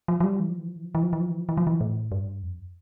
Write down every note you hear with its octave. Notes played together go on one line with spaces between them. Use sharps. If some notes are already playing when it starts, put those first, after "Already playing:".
F3
F3
G3
E3
F3
E3
F3
E3
F3
E3
F3
E3
F3
E3
F3
E3
F3
E3
A2
G2
F2